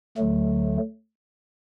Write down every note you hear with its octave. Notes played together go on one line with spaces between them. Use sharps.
D2 D3 F#3 A3